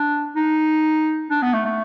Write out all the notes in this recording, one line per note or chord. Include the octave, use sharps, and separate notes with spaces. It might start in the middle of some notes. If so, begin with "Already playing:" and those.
Already playing: D4
D#4
D4
B3
A3
A3